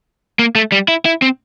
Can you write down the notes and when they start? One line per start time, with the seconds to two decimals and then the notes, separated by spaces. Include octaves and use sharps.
0.39 A#3
0.55 A3
0.72 G3
0.88 E4
1.05 E4
1.22 C4